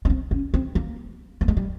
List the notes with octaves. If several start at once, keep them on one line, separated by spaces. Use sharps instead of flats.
C#4
C4
C#4
C4
A#3
A#3
G#3
G3